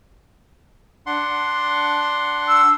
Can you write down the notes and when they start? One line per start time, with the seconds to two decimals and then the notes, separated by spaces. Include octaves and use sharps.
1.06 D4 F#5 C6
2.48 E6